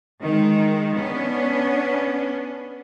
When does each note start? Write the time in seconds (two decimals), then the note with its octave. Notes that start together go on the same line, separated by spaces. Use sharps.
0.22 D#3 G#3
0.96 B3 C#4 D4